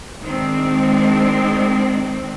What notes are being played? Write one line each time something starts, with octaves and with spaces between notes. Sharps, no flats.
D#3 G#3 C4 D4